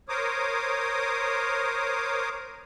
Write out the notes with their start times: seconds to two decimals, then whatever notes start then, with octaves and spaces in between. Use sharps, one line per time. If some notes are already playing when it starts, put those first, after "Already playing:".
0.09 A#4 C5 C#5 D6 D#6